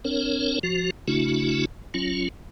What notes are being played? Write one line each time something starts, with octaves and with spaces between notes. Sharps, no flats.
C4 D4 A#4 C#5
F3 F#4
C#3 A3 D4 E4 F#4
F#3 C#4 F4